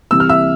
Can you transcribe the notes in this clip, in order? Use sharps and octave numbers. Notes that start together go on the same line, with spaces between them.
C2 C3 E3 E6
F6
E5 E6